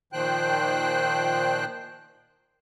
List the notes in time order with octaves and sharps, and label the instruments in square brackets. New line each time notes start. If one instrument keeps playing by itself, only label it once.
[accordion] A#2 D#3 F3 C5 G5 F#6